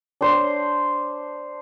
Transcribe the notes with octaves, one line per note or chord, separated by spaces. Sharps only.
D4 C5